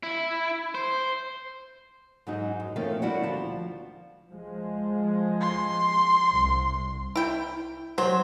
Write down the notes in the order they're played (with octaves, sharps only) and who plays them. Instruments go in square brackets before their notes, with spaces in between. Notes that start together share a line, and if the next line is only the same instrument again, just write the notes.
[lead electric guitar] E4
C5
[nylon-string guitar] G#2 F#3 D#4
F#2
F3 A3 C4 A#4 C#5 F5
G3 D4 E4 F#4 D5 F#5
D2 F3 A5
[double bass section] F3 G#3
[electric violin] C6
[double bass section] C2
[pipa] E4 G5
[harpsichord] F#3 [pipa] C5